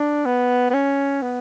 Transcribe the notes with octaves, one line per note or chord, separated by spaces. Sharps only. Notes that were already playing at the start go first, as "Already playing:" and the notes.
Already playing: D4
B3
B3
C#4
B3